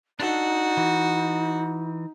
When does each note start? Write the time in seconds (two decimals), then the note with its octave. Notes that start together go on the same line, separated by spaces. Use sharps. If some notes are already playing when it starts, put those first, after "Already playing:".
0.20 D4 D#4 F#4 A4
0.77 E3